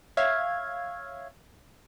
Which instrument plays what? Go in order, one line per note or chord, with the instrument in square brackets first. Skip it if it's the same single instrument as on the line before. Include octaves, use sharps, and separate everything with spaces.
[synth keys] C#5 E5 F5 G#6